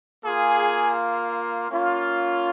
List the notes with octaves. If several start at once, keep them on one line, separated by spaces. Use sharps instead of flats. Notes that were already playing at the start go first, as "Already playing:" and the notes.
A#3 F4 G#4
A#3 C#4 F4